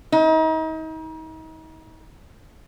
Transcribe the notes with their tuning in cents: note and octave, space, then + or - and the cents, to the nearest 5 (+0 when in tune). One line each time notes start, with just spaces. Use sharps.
D#4 +35